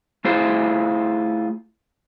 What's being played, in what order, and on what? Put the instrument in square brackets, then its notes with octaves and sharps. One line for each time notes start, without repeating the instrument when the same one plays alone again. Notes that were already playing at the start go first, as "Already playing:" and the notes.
[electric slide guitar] A3 E4 F4 G#4 C5